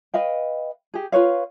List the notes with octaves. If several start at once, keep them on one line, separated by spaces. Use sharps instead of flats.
B4 D#5 F5 G5
G4 G#4
F4 B4 C#5 F5